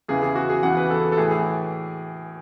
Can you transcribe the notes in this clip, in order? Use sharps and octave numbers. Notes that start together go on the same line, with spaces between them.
E2 C#3 E3 G#4
G#4
F#4
G#4
E2 C#3 E3 F#5
B4
A4
A4
A2 E3 G#4
G#4